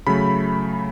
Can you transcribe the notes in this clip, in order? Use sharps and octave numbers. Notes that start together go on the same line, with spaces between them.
C#3 F#3 A3 B5